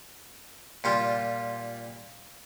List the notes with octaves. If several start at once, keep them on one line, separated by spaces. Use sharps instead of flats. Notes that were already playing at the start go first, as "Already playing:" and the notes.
A#2 G3 F4